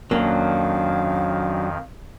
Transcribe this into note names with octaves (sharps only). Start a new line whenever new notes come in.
F2 D#3 F#3 A#3 C#4 D4 F5